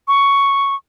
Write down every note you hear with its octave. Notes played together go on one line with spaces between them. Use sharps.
C#6